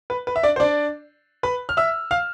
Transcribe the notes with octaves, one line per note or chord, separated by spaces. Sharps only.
B4
B4
E5
D4 D5
C5
D4 D5
B4 B5
F6
E5 E6
F5 F6